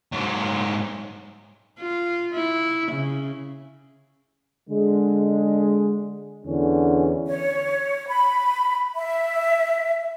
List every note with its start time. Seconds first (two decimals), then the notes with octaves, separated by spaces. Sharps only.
0.12 G#2 F#3
1.79 F4
2.33 E4
2.91 C#3
4.69 D3 G#3
6.45 E2 D3 C#4
7.27 C#5
8.08 B5
8.96 E5